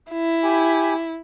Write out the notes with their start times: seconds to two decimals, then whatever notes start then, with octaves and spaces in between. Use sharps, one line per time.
0.11 E4
0.44 G4 G#5 B5